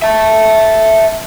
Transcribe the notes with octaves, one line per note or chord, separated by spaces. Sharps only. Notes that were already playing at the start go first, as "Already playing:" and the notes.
E5 A5